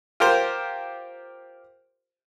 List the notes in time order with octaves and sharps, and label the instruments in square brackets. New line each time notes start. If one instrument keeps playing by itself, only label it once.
[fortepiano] F4 G4 A#4 C5